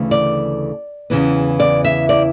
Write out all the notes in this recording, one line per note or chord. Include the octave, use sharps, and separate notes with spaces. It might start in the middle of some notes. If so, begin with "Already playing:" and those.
Already playing: D2 C#3 E3 A3
D5
E2 C#3 E3 B3
D5
E5
D5